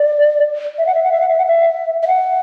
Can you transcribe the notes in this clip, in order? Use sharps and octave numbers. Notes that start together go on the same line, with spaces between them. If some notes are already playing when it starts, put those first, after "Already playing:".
Already playing: D5
E5
F#5
E5
F#5
E5
F#5
E5
F#5
E5
E5
F#5